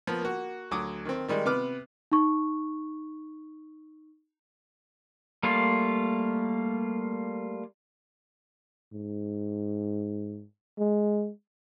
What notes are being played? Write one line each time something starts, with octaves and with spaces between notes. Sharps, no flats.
F3 A#3 B3
A#3 F#4
D2 F#3 D6 D#6
D#3 C4
D#3 G3 G#3
C3 B3 B4 D6 F6
D#4 C#6
G3 A3 A#3 F4
G#2
G#3